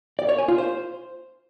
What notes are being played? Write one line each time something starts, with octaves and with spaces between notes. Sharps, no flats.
D5
C#5
G#5
F4
C5